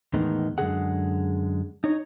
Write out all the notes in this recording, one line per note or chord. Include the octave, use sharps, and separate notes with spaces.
E2 A2 D#3 G#3 B3 D#4
F#2 D3 F3 G#3 G#4 F#5
D#4 C#5